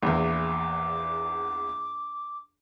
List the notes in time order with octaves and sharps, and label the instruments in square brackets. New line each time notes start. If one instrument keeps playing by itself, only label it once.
[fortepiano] A#1 E2 [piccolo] D6